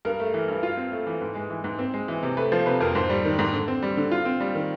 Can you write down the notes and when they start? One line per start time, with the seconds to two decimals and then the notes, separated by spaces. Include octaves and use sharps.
0.05 G2 A#4
0.20 A3
0.34 E3
0.48 G2
0.63 F4
0.77 C4
0.92 A3
1.07 E3
1.21 G#2
1.35 G#3
1.50 E3
1.64 G#2
1.79 C4
1.94 G#3
2.08 E3
2.23 C3
2.37 A3 B4
2.52 F3 C5
2.66 C3 B4
2.81 F2 A#4
2.95 G#2 C5
3.10 G3
3.25 D#3
3.39 G#2
3.53 D3
3.68 C4
3.83 G3
3.97 D3
4.12 F4
4.25 C4
4.40 G3
4.55 D#3